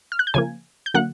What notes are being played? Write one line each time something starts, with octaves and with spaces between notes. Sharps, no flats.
F6
F#6
G6
C#3 F3 A#3 G#5 G#6
G6
D3 F#3 A#3 F#5 F#6